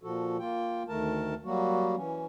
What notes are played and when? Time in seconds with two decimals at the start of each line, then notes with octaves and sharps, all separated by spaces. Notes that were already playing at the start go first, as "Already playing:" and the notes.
0.03 A#2 F3 F#4 A4
0.39 A#3 F4 G5
0.88 D2 D#3 A3 A#4 A5
1.45 F#3 G3 A#3 F#4
1.97 E3 C#4